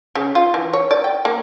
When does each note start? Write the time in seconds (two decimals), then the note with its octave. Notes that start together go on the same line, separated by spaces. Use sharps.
0.15 C#3
0.35 F4
0.54 E3
0.73 C#5
0.91 D5
1.04 G5
1.25 A#3